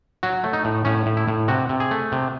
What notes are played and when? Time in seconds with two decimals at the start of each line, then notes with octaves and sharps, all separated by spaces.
0.23 F#3 F#4
0.44 A3
0.53 D#4
0.65 A2
0.85 A2 C#4
1.06 A2
1.17 E4
1.28 A2
1.48 C3 F#4
1.69 C3
1.80 G#4
1.91 A3
2.12 C3